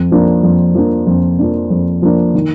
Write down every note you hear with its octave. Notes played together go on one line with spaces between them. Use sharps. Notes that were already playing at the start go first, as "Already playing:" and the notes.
Already playing: F2
F3 A#3 D4
F2
F3 A#3 D4
F2
F3 A#3 D4
F2
F3 A#3 D4
D#3